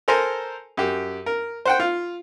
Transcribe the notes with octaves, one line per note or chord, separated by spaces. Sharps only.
A4 A#4 C5 G#5 A#5
F#2 G4
A#4
C5 F#5 G5
F4